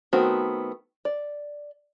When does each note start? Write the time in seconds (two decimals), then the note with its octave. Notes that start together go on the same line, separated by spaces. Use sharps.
0.13 D#3 A3 B3 C4 F#4
1.05 D5